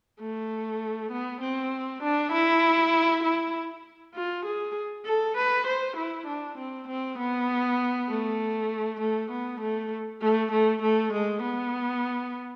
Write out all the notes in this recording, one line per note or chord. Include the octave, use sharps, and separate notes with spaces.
A3
B3
C4
D4
E4
E4
F4
G#4
A4
B4
C5
E4
D4
C4
C4
B3
A3
A3
B3
A3
A3
A3
A3
G#3
B3